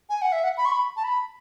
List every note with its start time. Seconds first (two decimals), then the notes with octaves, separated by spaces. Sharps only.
0.09 G#5
0.22 F#5
0.32 E5
0.44 F#5
0.57 B5
0.65 C#6
0.72 B5
0.97 A5
1.04 B5